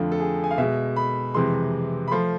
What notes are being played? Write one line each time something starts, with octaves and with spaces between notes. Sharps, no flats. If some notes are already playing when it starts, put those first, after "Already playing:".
Already playing: F2 D3 A3 F4
A4
G#4
G#5
F5
B2 G#3 E5
B5
F2 C3 E3 G#3 C6
B5
F3 A3 C6